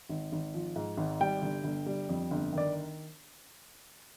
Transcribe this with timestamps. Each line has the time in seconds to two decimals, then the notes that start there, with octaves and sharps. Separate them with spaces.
0.09 G#1
0.32 G#1
0.54 F3
0.76 G#2
0.97 G#1
1.20 G3 G5
1.42 G1
1.64 G1
1.86 G3
2.09 F2
2.31 G1
2.53 D#3 D5